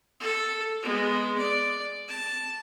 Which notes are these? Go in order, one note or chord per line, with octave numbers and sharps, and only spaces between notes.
A4
G#3 B3
D5
A5